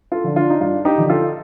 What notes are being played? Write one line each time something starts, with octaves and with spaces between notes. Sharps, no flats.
F4 A4
D3 F3
D4 F4
D#4
G2 D4 F4
D#4 G4
D3 F3
F4 A4